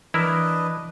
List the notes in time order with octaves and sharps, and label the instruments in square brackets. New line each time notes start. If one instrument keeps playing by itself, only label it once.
[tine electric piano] E3 [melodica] D4 B4 D#5 [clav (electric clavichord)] E4 A#4 E5